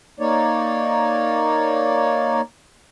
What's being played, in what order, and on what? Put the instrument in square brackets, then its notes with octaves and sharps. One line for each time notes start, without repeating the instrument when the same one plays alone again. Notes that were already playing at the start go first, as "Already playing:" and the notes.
[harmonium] A#3 D#4 C#5 D5